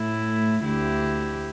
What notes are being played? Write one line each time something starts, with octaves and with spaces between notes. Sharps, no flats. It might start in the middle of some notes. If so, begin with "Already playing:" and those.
Already playing: A2 A3 E4
D2 D3 A3 E4 G4